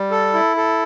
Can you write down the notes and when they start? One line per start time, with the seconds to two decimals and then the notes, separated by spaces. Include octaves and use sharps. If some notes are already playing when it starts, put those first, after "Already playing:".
Already playing: G3
0.11 A4
0.33 E4
0.57 A4